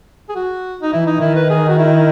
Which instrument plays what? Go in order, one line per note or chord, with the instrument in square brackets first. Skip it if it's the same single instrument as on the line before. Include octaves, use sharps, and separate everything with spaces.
[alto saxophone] G#4
F#4
D#4
[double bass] E3 [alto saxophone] E4
[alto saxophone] D#4
[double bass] D#3 [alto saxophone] E4
[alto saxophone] B4
G#4
F#4
E4